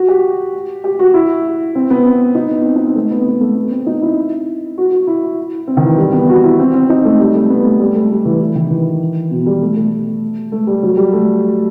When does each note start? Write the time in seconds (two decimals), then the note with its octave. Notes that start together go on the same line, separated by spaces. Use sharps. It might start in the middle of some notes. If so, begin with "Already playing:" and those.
Already playing: F#4
0.08 G4
0.84 G4
0.99 F#4
1.14 E4
1.75 C4
1.90 B3
2.05 C4
2.35 D#4
2.51 B3
2.65 C4
2.76 D#4
2.86 C4
2.95 A3
3.11 B3
3.26 B3
3.40 A3
3.56 B3
3.71 C4
3.86 D#4
4.02 E4
4.78 F#4
4.92 F#4
5.07 E4
5.67 C4
5.77 D#3
5.83 E3
5.98 G3
6.13 B3
6.29 F#4
6.44 E4
6.59 C4
6.74 C4
6.89 D#4
7.05 A3
7.20 G3
7.35 A3
7.50 B3
7.64 A3
7.80 G3
7.95 A3
8.10 G3
8.25 E3
8.41 E3
8.55 D#3
8.70 E3
9.31 B2
9.46 G3
9.62 A3
9.76 A3
10.52 A3
10.67 G3
10.83 F#3
10.97 G3
11.13 A3